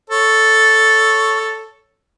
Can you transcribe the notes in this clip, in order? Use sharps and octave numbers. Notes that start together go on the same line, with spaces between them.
A4 C#5